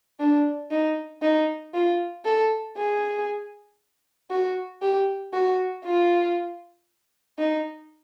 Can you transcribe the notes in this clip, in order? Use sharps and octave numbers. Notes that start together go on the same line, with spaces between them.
D4
D#4
D#4
F4
A4
G#4
F#4
G4
F#4
F4
D#4